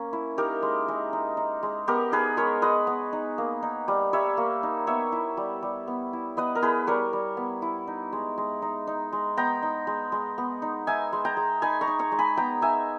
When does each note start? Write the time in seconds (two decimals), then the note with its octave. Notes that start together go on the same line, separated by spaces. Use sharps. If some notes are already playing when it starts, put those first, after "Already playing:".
Already playing: A#3 C#4
0.13 E4
0.37 D#4 G4 A#4
0.62 G#3
0.88 G#3
1.13 D#4
1.37 D#4
1.63 G#3
1.87 B3 G4 A#4
2.12 D#4 G#4 B4
2.37 G#3 A#4 C#5
2.62 G#3 B4 D#5
2.87 B3
3.13 D#4
3.38 A#3
3.63 D#4
3.88 G3
4.13 G3 C#5 E5
4.37 A#3
4.63 D#4
4.87 B3 C#5 E5
5.12 E4
5.37 G3
5.63 G3
5.87 B3
6.13 E4
6.37 B3 B4 D#5
6.55 A#4
6.62 E4 G#4 B4
6.87 G3 A#4 C#5
7.13 G3
7.37 B3
7.62 E4
7.87 D#4
8.12 G#3
8.38 G#3
8.62 D#4
8.87 D#4
9.13 G#3
9.37 B3 G5 A#5
9.63 D#4
9.87 G#3
10.12 G#3
10.38 B3
10.62 D#4
10.87 D#4 E5 G#5
11.13 G#3
11.25 G5 A#5
11.37 G#3
11.62 D#4 G#5 B5
11.81 A#5 C#6
11.87 D#4
11.99 A#5 C#6
12.12 G#3
12.19 G#5 B5
12.37 B3 G5 A#5
12.62 D#4 E5 G#5